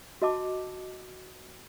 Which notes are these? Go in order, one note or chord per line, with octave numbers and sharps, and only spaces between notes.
F#4 D#5 A5 D6